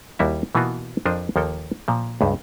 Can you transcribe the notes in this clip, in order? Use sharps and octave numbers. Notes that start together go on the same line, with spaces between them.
D#2 G3 E4 F#4 E5
B2 E3 A#3 B3 F4 F#4
F2 F3 D4 A#4 C5 D#5
D#2 F3 A#3 A4 G5
A#2 F3
C#2 G2